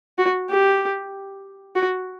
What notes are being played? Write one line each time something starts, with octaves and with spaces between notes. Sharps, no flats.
F#4
G4
F#4